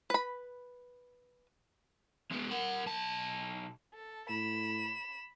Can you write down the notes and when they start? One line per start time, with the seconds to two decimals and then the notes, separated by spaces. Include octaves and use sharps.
0.10 B4 B5
2.32 G#3 B3
2.51 A#4 F#5
2.86 B1 A5
3.94 A4
4.29 A2 B5 E7